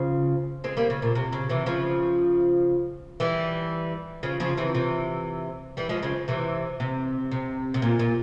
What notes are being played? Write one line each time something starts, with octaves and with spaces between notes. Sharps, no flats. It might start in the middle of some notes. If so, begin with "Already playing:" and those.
Already playing: C#3 F3
G#3 C4
G3 A#3
C#3
A#2
C3
C#3
C3 E3
C#3 F3
E3 G3
C#3 F3
C#3 F3
C3 E3
C3 E3
E3 G3
F3 G#3
C#3 F3
C3 E3
C3
C3
C3
A#2
A#2